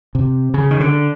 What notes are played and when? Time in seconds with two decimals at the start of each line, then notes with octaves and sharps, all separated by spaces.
0.15 C3
0.54 C#3
0.71 D#3
0.80 D3